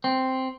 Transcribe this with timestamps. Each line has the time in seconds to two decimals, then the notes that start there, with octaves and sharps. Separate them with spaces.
0.04 C4